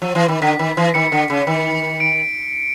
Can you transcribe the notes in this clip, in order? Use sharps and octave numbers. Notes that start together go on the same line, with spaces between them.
F3
E3
D#3
D3 B6
D#3
E3
D#3 C#7
D3
C#3
D#3
D7